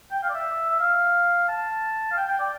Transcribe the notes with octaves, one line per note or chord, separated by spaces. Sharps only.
G5
F5
D5
E5
E5
F5
A5
F5
G5
G5
D5